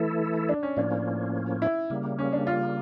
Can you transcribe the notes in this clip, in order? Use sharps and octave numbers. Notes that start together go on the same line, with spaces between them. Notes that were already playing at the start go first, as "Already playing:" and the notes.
Already playing: E3 A3 E4 A4
D4
C#4
A2 F3 A#3 C#4 D4
E4
C#3 G3 A#3
C#4
D4
F4